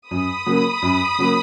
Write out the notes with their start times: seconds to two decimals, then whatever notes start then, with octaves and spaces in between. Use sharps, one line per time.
0.10 F#2 B5 D#6
0.46 C#3 F#3 A#3
0.82 F#2
1.18 C#3 F#3 A#3